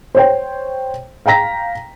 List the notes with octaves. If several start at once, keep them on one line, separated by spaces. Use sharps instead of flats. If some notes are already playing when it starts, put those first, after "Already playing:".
C5 C#5 G5
F5 G5 A#5 A#6 B6